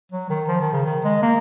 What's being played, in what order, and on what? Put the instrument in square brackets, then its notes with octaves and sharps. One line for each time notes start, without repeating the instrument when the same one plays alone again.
[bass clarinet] F#3
D#3
F3
D#3
C#3
D#3
G#3
A#3